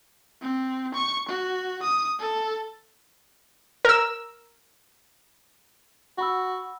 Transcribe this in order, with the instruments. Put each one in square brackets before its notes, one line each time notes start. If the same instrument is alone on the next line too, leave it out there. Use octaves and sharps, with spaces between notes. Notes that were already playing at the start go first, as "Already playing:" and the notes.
[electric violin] C4
C#6
F#4
D#6
A4
[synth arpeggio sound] A#4 E6
[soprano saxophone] F#4 [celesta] F#5 B5 E6